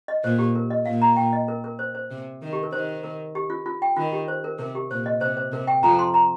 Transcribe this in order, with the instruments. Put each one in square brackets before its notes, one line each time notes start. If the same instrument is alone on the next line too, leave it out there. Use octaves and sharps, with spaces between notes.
[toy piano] D#5
[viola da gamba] A#2 [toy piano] C5
[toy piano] G4
A#4
D#5
[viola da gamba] A#2 [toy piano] F5
[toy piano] A#5
G5
D#5
A#4
A#4
C5
C5
[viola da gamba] C3
D#3
[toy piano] G4
A#4
[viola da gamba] D#3 [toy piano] C5
[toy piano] A#4
G4
F4
F4
G5
[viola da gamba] D#3 [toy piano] F4
[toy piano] G4
C5
A#4
[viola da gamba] C3 [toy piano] A#4
[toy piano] G4
[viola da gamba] A#2 [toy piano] C5
[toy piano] D#5
[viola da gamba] C3 [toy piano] C5
[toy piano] C5
[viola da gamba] C3 [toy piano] A#4
[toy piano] G5
[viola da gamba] F2 F3 [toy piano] A#5
[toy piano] C6
A#5